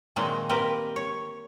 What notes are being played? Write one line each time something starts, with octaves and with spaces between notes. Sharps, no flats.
A#2 D#3 F#3 G#3 A#3 C4
A#3 C4 G4 A#4 B4
C#5